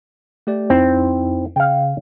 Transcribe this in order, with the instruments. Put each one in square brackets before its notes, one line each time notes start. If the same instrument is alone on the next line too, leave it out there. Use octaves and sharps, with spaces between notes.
[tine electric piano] A3 G4 D5
[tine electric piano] F2 D#4 E4 [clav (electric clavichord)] C4
[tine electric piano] C#3 [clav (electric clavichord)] F5 G5